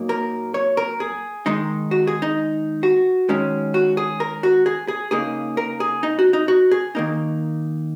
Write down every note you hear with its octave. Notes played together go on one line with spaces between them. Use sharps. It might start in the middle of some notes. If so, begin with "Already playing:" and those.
Already playing: A#2 F#3 A#3 D#4
A#4
C#5
A#4
G#4
D#3 G#3 D#4
F#4
G#4
D#4
F#4
D#3 G#3 C#4
F#4
G#4
A#4
F#4
G#4
G#4
C#3 A#3 D#4 G#4
A#4
G#4
D#4
F#4
D#4
F#4
G#4
D#3 A#3 D#4